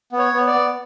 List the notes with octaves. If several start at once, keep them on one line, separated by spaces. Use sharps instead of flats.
B3
C#5
B3
D5
B3